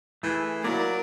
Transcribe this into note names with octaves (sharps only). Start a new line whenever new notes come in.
E3 A3 G#4
F#3 A#3 E4 A#4 D5